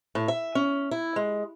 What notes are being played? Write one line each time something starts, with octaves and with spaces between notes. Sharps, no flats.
A2
E5
C#4
E4
G#3